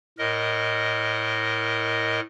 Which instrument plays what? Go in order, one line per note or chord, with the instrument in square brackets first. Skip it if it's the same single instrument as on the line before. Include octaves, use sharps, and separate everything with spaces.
[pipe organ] A2 A#4 D#5